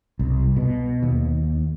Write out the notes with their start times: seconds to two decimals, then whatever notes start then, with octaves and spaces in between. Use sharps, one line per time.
0.19 C2
0.57 B2
1.03 D#2